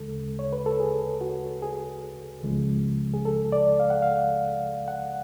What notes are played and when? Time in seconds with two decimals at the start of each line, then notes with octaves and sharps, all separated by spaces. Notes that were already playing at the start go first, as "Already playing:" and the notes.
Already playing: D2 C#3 G#3 A4
0.39 C#5
0.53 B4
0.66 A4
0.80 G#4
1.21 F#4
1.62 G#4
2.43 C#2 C#3 F3 G#3
3.14 G#4
3.25 A4
3.52 D5
3.80 F5
3.90 F#5
4.02 F5
4.88 F#5